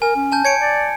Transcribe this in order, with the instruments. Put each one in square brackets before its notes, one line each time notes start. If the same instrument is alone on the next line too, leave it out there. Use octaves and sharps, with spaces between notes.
[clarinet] A#4 [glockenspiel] G#5
[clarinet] C#4
[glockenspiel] G#5 A5 G6
[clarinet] C#5 [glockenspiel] G#6 C#7 D7
[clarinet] D5